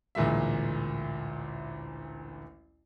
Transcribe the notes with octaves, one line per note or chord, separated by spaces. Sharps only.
A1 D2 A#2 G#3 E5